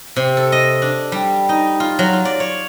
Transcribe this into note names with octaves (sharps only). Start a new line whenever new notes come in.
C3
A4
D#5
D4
G3
D#4
F4
F#3
F4
D5
C#5